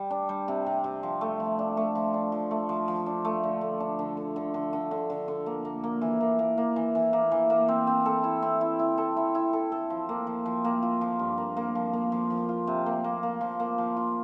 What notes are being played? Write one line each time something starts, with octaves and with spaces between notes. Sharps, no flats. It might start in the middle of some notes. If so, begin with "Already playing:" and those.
Already playing: G3
D4
G3
C3
C3
C3
F3
A3
F3
D4
A3
F3
D4
F3
A3
F3
F3
D4
A3
D3
A3
D4
D3
D3
D3
D3
D3
D3
D3
D3
A#3
A#3
A#3
E3
A#3
A#3
A#3
E3
E3
A#3
E3
A#3
C4
C4
A4
E4
C4
E4
E4
A4
E4
E4
A4
A4
F3
A#3
F3
F3
A#3
F4
F3
G2
A#3
A#3
F3
A#3
F3
F3
F4
C3
A#3
A#3
A#3
F3
A#3
F3
F4